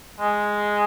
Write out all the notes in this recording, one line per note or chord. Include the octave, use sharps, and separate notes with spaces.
G#3